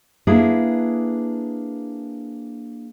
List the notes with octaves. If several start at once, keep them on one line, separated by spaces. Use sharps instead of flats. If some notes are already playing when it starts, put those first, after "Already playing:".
A#3 D4 E4 G#4 A4 B4